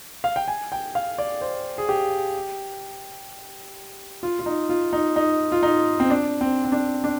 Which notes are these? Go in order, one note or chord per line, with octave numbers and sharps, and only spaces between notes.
F5
G5
G#5
G5
F5
D5
C5
G#4
G4
F4
F4
D#4
F4
D#4
D#4
F4
D#4
C4
D4
C4
C4
D4
D4